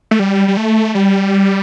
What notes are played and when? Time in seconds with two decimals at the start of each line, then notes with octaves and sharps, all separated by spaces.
0.11 A3
0.19 G3
0.48 G3
0.57 A3
0.95 G3